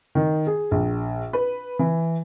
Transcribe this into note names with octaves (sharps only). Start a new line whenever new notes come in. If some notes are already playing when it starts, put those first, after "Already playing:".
D#3
G#4
A#1
B4
E3